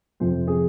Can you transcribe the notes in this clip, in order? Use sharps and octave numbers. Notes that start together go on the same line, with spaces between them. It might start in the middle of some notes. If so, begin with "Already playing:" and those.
F2 C3 F3 C5
G#4